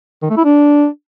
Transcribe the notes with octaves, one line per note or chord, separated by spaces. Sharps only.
D#3
A3
E4
D4